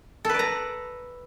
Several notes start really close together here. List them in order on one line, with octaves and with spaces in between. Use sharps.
A4 B4 D5 A#5